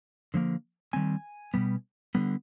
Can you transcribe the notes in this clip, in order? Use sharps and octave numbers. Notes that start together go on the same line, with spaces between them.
D3 F3 A#3
D#3 G3 C4 G#5
B2 G3 B3
D3 G3 B3